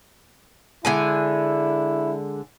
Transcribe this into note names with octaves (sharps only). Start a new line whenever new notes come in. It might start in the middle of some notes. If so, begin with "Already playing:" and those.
D3 G#3 E4 G#5